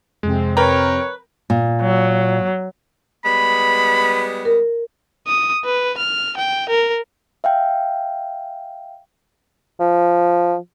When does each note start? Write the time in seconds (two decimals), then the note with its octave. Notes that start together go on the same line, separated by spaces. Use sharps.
0.23 F2 C3 G#3 C4
0.57 A#4 B4 C#5 G5 A#5
1.50 A#2
1.82 F#3
3.25 G3 G#3 B3 B5
4.45 A#4
5.27 D#6
5.65 B4
5.98 F6
6.37 G5
6.69 A#4
7.44 E5 F5 G5
9.80 F3